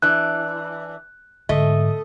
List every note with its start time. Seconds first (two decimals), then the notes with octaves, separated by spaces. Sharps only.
0.02 E3 D4 F#6
1.49 G#2 D3 A3 D#5